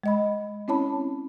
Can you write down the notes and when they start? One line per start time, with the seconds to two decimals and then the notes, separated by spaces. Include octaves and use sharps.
0.04 G#3 D#5 B5
0.68 C4 C#4 E4 C#5 A5 B5